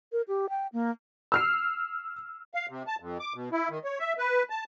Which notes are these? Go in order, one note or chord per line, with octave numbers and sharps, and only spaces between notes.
A#4
G4
G5
A#3
E6 F6 C7
F5
C3
A5
F2
D6
B2
E4
D#3
C#5
E5
B4
A5